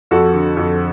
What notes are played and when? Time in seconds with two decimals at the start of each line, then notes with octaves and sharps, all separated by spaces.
0.11 F2 F#4 A4
0.34 D3
0.57 F2